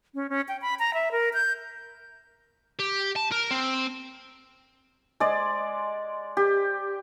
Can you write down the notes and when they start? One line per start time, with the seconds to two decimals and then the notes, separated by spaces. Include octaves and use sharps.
0.15 C#4
0.30 C#4
0.48 G5
0.62 B5
0.79 A#5
0.94 E5
1.12 A#4
1.34 G6
2.80 G4
3.16 A5
3.32 A#4
3.51 C4
5.20 G#3 D5
6.37 G4